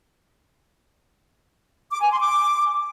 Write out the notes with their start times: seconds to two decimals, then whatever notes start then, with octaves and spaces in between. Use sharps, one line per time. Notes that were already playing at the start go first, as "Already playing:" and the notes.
1.91 D6
2.01 G#5
2.11 C6
2.20 D6